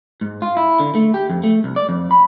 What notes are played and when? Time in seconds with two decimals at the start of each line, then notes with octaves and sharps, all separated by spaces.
0.21 G#2
0.42 F4
0.57 E4
0.80 D3
0.95 A3
1.14 G4
1.30 F2
1.44 A3
1.64 C2
1.76 D5
1.89 F2
2.11 B5